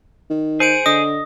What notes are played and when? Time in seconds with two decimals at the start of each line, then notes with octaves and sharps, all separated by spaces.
0.30 D#3
0.60 G#4 C5 C#7 D7
0.86 D3 D#5 D#6